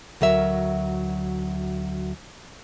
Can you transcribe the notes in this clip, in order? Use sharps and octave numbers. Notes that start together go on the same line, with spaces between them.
D2 F#3 A#4 E5